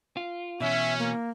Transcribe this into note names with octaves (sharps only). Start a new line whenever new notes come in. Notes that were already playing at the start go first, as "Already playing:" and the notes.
F4
B2 E3 C#4 E5
A#3